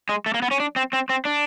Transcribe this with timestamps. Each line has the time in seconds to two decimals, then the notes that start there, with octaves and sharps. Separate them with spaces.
0.09 G#3
0.26 A3
0.34 A#3
0.42 B3
0.51 C#4
0.60 D4
0.76 C4
0.93 C4
1.09 C4
1.25 D4